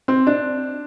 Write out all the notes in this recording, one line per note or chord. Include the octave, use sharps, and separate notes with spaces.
C4
D4